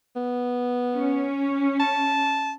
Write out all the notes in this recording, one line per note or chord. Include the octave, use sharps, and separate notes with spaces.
B3
C#4
A5